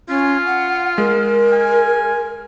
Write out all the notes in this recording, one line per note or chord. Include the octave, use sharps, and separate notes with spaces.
C#4 F4
F#5
G#3 A#4
G#5